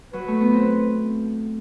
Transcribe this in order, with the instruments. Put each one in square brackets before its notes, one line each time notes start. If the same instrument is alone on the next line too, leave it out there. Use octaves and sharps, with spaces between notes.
[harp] F#3 [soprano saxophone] B4
[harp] A3
B3
C4